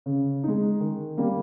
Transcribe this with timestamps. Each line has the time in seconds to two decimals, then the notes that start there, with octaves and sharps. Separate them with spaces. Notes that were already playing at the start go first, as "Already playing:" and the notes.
0.06 C#3
0.43 G#3 D#4
0.80 D#3
1.17 G3 A#3